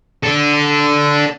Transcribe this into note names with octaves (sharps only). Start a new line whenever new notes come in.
D4 A4